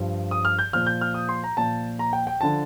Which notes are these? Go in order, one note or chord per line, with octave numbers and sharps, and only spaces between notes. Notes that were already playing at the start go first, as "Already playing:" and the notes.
Already playing: G2 F3
D#6
F6
G6
A#2 F3 F6
G6
F6
D#6
C6
A#5
A#2 F3 A5
A#5
G5
G5
D3 F3 A5